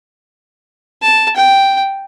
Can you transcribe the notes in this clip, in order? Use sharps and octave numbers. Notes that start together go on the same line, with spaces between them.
A5
G5